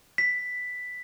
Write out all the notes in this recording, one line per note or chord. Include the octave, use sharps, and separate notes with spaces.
B6